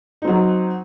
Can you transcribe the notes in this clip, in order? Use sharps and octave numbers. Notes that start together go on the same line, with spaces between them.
F#3 C4 D#4